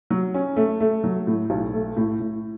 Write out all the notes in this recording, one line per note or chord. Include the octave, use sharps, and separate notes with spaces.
F#3
C#4
A3
A3
F#3
A2
B1
A3
A2
A2